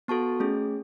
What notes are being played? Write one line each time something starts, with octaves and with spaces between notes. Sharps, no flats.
B3 F#4 A4 A5 C#6
A3 C#4 G#4